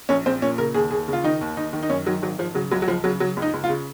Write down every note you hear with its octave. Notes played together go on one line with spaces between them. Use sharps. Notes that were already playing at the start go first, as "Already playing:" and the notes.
A#1 C#4
A#1 C4
A#2 C#4
C#3 A#4
D#2 G#4
D#2 G#4
C#3 F4
D#3 D#4
D#2
D#2 D#4
D#3
D#4
F#2 C#4
D#3 F#3
G#1 F#3
G#1 F3
C#3 F#3
C#2 F#3
F#3
C#2 F3
C#3 F#3
C#3 F#3
C#2
D#4
C#2
F4
C#3